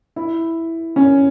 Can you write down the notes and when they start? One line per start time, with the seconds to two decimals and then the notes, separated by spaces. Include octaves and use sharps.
0.16 E4
0.96 C#4